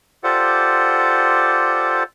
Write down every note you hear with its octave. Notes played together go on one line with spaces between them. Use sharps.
F4 G4 A4 C5 D5 F#5